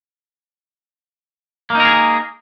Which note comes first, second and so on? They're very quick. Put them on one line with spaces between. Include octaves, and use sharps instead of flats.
A#3 D#4 A#4 G#4